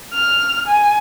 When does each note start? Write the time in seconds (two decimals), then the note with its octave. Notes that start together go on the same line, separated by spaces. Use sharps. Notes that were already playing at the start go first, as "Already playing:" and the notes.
0.13 F6
0.68 G#5